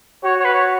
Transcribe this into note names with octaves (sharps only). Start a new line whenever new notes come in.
F#4 C#5
C#5
B4
C#5